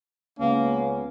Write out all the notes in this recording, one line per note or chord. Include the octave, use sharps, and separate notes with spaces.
C#2 A#3 B3 C#4